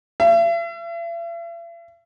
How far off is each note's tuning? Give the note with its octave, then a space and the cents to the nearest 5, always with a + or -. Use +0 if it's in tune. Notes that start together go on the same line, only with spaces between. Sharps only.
E5 +45